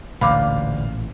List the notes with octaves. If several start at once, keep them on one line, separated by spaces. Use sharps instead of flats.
A1 D2 A#2 F5 B5 D6